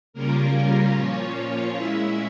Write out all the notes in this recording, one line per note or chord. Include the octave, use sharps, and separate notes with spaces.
C#3 G3 A#3 C#4 F4 A#4
A#2 F3 A#3 C#4 F4 C#5
A#2 G#3 C#4 E4 E5